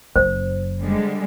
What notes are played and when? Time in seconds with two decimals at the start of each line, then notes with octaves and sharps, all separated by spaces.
0.16 F#1 F#2 C5
0.80 D3 G3 G#3